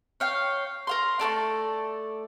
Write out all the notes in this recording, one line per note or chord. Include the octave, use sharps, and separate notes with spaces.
C#5 F5 G5
A#4 F5 C6
A3 F4 A4 D5